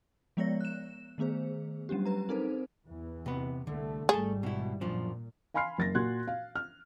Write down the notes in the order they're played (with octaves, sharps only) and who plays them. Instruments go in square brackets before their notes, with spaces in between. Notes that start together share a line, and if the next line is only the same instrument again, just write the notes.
[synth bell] F3 G#3 B3 C#5 D5 A#6
F#6 E7
D#3 A3 B3 G#4 C5
F#3 G3 C#4 D4 G4
B4 A#5
C4 D#4 A4 A#4 C5
[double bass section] E2 E3
[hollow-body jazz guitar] C3 B3
[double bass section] C2 A3 [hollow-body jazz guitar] D3
[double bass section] G#1 G#2 G3 [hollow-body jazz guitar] A3 A4 A5 [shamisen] G#4
[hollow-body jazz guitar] B2 E4
[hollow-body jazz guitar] F#2 F3 D4 [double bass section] A#2
[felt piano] F5 G#5 B5 C6 F6 C7
F#1 A6 A#6
A#2 F#4 C6 F#6 G#6
F5
F6